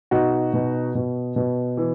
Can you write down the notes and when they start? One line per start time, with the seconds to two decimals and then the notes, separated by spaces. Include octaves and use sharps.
0.11 B2 D#4 F#4
0.53 B2
0.95 B2
1.36 B2
1.77 E3